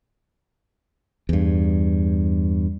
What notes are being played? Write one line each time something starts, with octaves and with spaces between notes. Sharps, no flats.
E2 G2